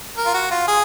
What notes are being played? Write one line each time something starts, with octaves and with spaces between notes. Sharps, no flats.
A#4
F4
F#4
F4
G#4